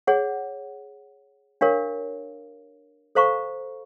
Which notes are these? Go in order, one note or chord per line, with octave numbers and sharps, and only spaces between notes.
G#4 C#5 F#5
D4 G4 A#4 C#5 F5
A4 C5 F5 A#5 C#6